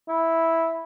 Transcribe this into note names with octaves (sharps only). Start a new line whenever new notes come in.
E4